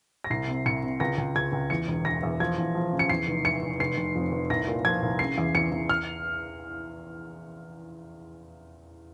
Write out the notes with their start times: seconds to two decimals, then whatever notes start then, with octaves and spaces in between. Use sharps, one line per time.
0.24 A#6
0.30 C2 C7
0.48 C3
0.66 C2 C#7
0.83 C3
1.00 C#2 A#6
1.18 C#2
1.35 C#2 G#6
1.53 C#2
1.70 E2 C#7
1.88 E1
2.05 E1 A#6
2.23 E2
2.40 F3 G#6
2.58 E2
2.75 F3
2.93 C#3
2.99 C#7
3.09 E2 C7
3.27 F1
3.45 E3 C#7
3.63 F1
3.80 F1 C7
3.97 F1
4.15 F2
4.32 F1
4.50 C2 A#6
4.67 A#2
4.85 F3 G#6
5.02 C2
5.19 C#3 C7
5.38 E2
5.55 E2 C#7
5.72 E2
5.89 F6